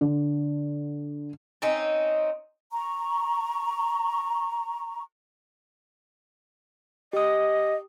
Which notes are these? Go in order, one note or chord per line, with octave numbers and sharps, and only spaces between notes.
D3
C4 C#4 D#4
A#5 C#6
G4 D#5 D#6